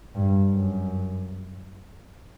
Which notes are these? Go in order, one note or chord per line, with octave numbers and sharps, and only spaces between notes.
G2
F#2